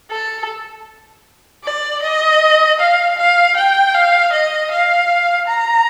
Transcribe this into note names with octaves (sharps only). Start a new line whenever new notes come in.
A4
D5
D#5
F5
F5
G5
F5
D#5
F5
A#5